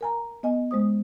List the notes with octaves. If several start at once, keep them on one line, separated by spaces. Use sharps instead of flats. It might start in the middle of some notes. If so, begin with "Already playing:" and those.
A#4 G#5 A#5
B3 D#5 G#5
G#3 C5 D#6